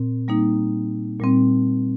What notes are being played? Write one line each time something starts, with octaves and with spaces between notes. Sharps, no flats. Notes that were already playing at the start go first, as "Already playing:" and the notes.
Already playing: A#2 C4
G3 A#3 D#4
A#2 G3 C4